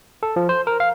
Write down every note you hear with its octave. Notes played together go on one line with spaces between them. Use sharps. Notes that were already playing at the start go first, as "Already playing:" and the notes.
A4
F3
C5
A#4
F5